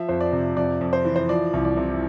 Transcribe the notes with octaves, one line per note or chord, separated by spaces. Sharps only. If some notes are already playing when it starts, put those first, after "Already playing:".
Already playing: F3 E5
F2 C5
D5
C3
F2 D5
F2
C5
E3
C5
F3 D5
C2
D5
C3